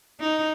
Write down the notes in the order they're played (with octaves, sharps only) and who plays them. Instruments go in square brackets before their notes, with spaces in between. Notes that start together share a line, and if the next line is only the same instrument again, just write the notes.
[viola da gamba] D#4